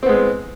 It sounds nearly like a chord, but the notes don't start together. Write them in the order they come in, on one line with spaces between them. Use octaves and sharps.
C4 B3 G#3